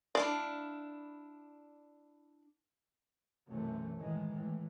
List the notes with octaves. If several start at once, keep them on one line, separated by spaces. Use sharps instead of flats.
D4 E4 D5 F5
B1 F#2 C3 E3 A3 C#4
A2 D#3 E3 G#3
A2 E3